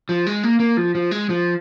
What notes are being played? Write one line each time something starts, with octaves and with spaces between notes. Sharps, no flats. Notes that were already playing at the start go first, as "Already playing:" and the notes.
F3
G#3
A#3
A#3
F3
F3
G#3
F3